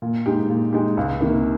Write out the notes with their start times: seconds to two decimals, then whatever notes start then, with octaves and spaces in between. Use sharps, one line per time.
0.02 A#2
0.26 G#3 D#4 G4
0.49 A#2
0.73 G#3 D#4 G4
0.97 C#2
1.21 C3 D#3 A#3